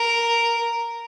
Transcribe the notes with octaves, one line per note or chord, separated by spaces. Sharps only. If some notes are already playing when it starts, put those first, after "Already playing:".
Already playing: A#4